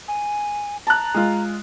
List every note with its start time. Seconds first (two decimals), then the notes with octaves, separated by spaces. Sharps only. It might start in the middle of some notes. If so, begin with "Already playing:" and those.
0.08 G#5
0.87 A5 A#5 F#6
1.14 G#3 F4